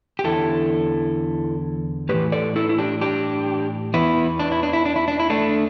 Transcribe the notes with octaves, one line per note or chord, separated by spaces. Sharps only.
G4
E2 D3 E4 A4
A2 E3 G4 B4
A4 D5
E4 A4
E4
D4 G4
D4 G4
E2 E3 B3 E4
D4
E4
D4
E4
D4
E4
D4
E4
A3 D4